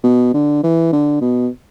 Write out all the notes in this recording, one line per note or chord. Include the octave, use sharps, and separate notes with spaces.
B2
D3
E3
D3
B2